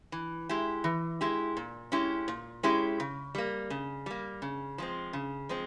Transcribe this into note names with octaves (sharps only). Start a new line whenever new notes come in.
E3
G#3 E4 G4
E3
G#3 E4 G4
A#2
G#3 C#4 E4 G4
A#2
G#3 C#4 E4 G4
C#3
G3 A#3
C#3
G3 A#3
C#3
F3 G#3 C4
C#3
F3 G#3 C4